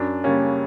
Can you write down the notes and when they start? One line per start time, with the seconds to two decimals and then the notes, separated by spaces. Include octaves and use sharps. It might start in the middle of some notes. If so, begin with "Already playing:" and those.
Already playing: F#2 D4
0.24 C#3 G3 A#3 C#4